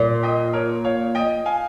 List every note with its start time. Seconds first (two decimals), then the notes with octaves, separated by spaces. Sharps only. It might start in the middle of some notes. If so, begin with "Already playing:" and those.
Already playing: A#2
0.23 D#5 G5
0.53 A#4 C#5
0.84 C#5 F5
1.15 D#5 G5
1.46 F5 G#5